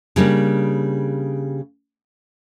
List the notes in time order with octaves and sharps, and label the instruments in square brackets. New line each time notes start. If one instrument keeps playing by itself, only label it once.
[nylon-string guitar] C#3 G3 A#3 D4